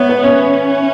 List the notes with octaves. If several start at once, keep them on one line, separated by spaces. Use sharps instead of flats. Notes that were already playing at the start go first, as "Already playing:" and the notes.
Already playing: B3 C#5 E5
B4
C#4 C#5